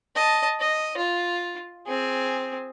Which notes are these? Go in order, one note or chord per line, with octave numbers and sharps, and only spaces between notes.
D#5 A5
D#5
F4
C4 G#4